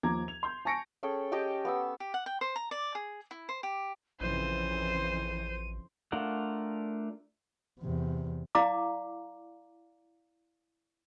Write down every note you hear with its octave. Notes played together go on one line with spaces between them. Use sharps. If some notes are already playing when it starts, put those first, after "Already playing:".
D#2 F3 A#5 D6 G#6
F7
C6 G6
G#5 A5 C#6 A#6 C#7 D7
C#4 G#4 A4 G5
G4 D#5 G5 A5
B3 F#5 E6
G4
F#5
G5
C5
A#5
D5
G#4
E4
C5
G4
A1 F2 C#3 E3 C5 D#7
A3 D4 F4 A#4 F#5
E2 C3
E4 D5 F5 A#5 D6